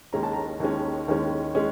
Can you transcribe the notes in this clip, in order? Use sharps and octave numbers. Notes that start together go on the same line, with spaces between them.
D#2 D#3 G#3 C#4 A#5
A5
A#5
D#2 D#3 G#3 C#4
D#2 D#3 G#3 C#4
G#3 C#4